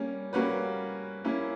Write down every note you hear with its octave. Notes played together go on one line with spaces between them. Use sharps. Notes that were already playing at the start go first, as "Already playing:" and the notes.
Already playing: G3 A#3 C#4
G3 A#3 C#4 F#4 B4
A#3 C#4 E4